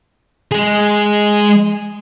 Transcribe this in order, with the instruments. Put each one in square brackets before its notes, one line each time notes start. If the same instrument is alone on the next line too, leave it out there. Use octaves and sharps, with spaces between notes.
[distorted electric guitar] G#3 G#4